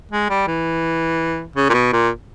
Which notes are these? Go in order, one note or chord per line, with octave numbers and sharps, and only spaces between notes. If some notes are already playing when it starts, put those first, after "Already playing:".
G#3
G3
E3
C#3
A#2
B2
A#2